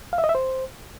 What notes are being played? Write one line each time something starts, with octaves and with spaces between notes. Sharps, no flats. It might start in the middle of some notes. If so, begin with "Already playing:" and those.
F5
E5
D#5
E5
C5